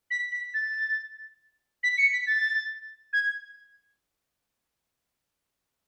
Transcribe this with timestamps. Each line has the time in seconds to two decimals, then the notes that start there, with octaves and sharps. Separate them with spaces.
0.10 B6
0.32 B6
0.54 A6
1.83 B6
1.97 C#7
2.13 B6
2.27 A6
3.13 G#6